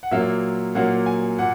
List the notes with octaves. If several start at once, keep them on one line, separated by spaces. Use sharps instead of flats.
F#5
A#2 F#3 A#3 E5
A#2 F#3 A#3 F#5
G#5
A#2 F#5